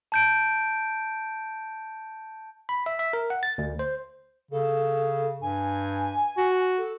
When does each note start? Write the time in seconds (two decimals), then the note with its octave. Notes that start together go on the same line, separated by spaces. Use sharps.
0.12 A5 G6 D7
2.69 B5
2.86 E5
2.99 E5
3.13 A#4
3.30 F#5
3.43 A6
3.58 D2
3.79 C5
4.51 C#3 A4
5.41 G2 G#5
6.37 F#4
6.77 A4